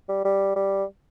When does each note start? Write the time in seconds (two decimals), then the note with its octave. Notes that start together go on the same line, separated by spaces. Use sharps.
0.09 G3
0.25 G3
0.56 G3